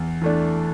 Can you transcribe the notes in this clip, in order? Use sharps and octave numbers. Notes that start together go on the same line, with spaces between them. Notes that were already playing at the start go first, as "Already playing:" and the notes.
Already playing: E2
E3 A3 D4